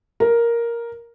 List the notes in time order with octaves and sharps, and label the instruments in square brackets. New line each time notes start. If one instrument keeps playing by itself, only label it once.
[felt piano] A#4